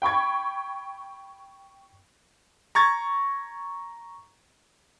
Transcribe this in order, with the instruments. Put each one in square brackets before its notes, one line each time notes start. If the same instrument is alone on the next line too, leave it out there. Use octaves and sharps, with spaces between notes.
[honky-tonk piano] G5 B5 C#6 G#6
[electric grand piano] A#5 C#6 G#6 A6